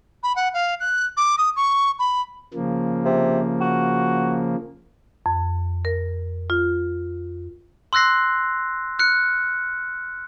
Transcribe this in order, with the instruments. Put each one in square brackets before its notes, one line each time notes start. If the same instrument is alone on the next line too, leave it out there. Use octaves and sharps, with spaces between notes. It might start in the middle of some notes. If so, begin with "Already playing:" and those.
[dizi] B5
F#5
F5
F#6
D6
D#6
C#6
B5
[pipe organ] C#3 F3 A#3
[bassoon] C3
F#4
[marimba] F2
A#4
F4
[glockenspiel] C6 E6 F#6 A#6 C7
F6 F#6 C#7